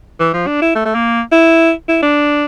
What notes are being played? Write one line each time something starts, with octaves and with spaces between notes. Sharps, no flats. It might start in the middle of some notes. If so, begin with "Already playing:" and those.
E3
F3
D4
E4
A3
A3
A#3
E4
E4
D4